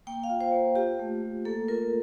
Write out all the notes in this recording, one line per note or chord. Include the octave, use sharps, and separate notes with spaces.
A#3 G5
F5
F4
C5
A#3
F4 G4
A3
A3
A#3 A4
F4 A#4